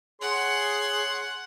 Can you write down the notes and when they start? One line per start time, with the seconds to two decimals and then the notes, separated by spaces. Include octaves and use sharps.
0.21 G#4 C#5 F#5 C6